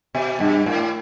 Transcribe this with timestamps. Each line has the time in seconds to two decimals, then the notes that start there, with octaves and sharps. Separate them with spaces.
0.15 B2
0.40 G2
0.66 A2